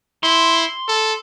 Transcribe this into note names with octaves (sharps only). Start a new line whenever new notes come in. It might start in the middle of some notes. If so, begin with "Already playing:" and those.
E4 C6
A4